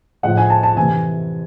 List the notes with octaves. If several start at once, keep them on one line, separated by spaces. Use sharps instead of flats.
A2 F3 G#3 F#5
G#5
A5
A5
C3 E3 A3 G#5